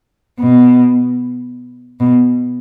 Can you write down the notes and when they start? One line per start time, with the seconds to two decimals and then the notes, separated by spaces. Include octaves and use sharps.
0.40 B2
2.00 B2